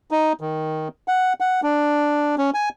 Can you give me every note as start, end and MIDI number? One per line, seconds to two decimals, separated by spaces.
0.11 0.33 63
0.41 0.88 51
1.08 1.33 78
1.40 1.61 78
1.63 2.35 62
2.38 2.50 61
2.54 2.69 80